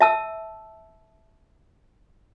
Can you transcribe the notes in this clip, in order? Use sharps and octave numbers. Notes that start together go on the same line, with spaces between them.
E5 A5 E6